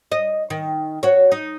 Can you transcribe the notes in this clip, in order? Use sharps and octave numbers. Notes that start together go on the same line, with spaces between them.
D#5
D#3
F#4 C#5
D#4